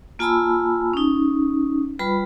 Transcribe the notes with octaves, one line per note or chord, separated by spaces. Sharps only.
A#3 F4 G#5 A5 B5 E6
C#4 D#4
G3 F4 B4 B5